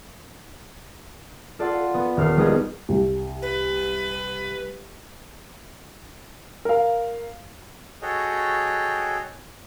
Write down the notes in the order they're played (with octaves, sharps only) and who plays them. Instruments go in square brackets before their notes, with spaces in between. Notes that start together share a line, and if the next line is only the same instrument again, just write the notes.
[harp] F4 A4 D5 F#5 C6
B3
D#1 F6 C7
G3 G#3 B3 D#4 G4 G#4
[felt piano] C2
[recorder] B4
[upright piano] A#4 F5
[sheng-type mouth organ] F#4 G#4 A4 C#5 D#5 G5